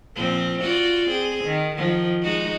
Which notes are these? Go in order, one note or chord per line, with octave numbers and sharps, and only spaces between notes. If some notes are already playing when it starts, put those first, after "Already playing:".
A#2 F3 C4
F4 F#4 D5
C4 G#4
D#3
D#3 F3
G#3 D#4 F#4